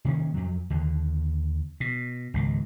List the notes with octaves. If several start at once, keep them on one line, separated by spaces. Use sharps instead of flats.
C3 D#3 A#3 C#4
F2 F#3
D#2 D3
B2
G#1 C#2 D#3